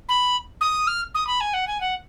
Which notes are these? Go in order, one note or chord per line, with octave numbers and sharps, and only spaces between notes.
B5
D#6
F6
D#6
B5
G#5
F#5
G#5
F#5